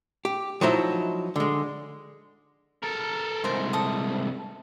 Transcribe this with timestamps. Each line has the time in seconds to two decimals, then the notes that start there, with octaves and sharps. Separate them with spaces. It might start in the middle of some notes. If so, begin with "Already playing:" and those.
0.25 G4
0.61 F3 F#3 D#4 E4
1.36 D3 G#3
2.83 A4 A#4
3.44 C2 G#2 A#4 C5
3.73 A4 D#6